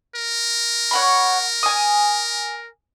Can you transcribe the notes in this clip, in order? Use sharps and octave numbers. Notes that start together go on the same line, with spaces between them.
A#4
C#5 F#5 B5
G#5 D#6